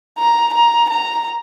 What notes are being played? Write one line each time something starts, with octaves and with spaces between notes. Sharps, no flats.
A#5
A#5
A#5